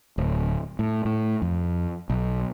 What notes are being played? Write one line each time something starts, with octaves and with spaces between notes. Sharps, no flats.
D1
A2
A2
F2
B1